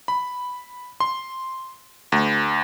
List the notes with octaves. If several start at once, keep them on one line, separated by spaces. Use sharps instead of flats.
B5
C6
D2